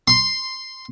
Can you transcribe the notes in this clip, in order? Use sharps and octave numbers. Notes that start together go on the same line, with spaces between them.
C6